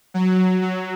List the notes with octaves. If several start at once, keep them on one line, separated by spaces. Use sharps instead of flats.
F#3
F#3